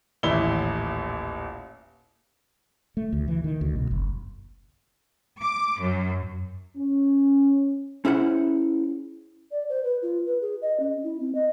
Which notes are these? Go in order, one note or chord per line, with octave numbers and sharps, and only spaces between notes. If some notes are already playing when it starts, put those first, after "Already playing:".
D#1 A1 E4 G7
A3
D2
E3
D#3
D2
B1
F#1
D6
F#2
C#4
C#4 E4 G#4 C5 F#5
D5
C5
B4
F4
B4
G#4
D#5
C#4
E4
C4
D#5